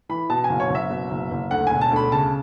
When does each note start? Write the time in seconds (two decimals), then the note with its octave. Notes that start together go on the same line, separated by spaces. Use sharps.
0.09 E3 B5
0.30 B2 A5
0.44 G#5
0.49 F#1
0.60 C#5
0.70 F#1
0.75 E5
0.90 B2
1.11 F#1
1.31 F#1
1.51 D2 F#5
1.67 E1 G#5
1.81 A5
1.91 D2 B5
2.12 C#3 A5